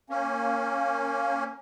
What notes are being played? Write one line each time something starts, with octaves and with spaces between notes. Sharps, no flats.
A#3 C#4